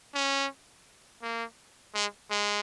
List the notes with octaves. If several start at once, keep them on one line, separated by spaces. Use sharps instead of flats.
C#4
A#3
G#3
G#3